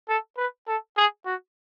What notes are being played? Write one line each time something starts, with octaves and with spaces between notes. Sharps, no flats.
A4
B4
A4
G#4
F#4